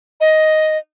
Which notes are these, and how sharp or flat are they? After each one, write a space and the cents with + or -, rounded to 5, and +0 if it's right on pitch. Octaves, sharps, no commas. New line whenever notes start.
D#5 +5